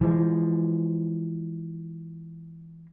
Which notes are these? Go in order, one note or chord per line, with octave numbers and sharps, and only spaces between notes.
E3 F3 G#3